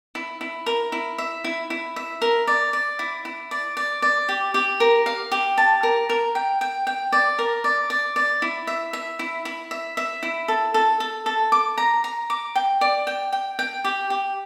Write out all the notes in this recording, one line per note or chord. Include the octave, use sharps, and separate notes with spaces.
E4
E4
A#4
E4
E5
E4
E4
E5
A#4
D5
D5
E4
E4
D5
D5
D5
G4
G4
A#4
F5
G4
A5
A#4
A#4
G5
G5
G5
D5
A#4
D5
D5
D5
E4
E5
E5
E4
E4
E5
E5
E4
A4
A4
A4
A4
D6
A#5
A#5
D6
G5
D5
G5
G5
G5
G4
G4